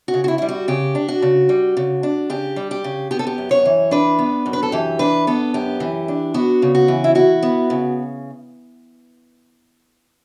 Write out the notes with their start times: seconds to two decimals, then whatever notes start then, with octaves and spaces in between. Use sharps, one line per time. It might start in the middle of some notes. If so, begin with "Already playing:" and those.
0.08 F#4
0.14 C#3
0.24 F#4
0.28 E4
0.38 G3 E4
0.49 F#4
0.68 C#3 G4
0.95 D4
1.08 F#4
1.22 C#3
1.49 G3
1.77 C#3
2.03 D4
2.30 C#3 G4
2.56 G3
2.71 G4
2.84 C#3
3.11 B3 G4
3.19 A4
3.27 G4
3.38 F#2
3.51 C#5
3.66 E3
3.91 D4 B4
4.19 B3
4.46 F#2
4.53 B4
4.63 A4
4.72 E3 G4
4.99 D4 B4
5.27 B3 A4
5.54 F#2 G4
5.80 E3
6.08 D4
6.34 B3 F#4
6.62 C#3
6.75 F#4
6.88 E3
7.04 E4
7.15 E4 F#4
7.43 B3
7.70 C#3